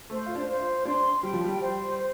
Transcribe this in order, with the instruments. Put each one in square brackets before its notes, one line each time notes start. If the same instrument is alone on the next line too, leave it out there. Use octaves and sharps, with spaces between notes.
[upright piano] A3 [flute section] C5
[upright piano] F4
D4
[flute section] C5
[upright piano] F4
[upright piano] D4 [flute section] C6
[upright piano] G3 [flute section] G5
[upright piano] F3
G3
[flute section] C5
C5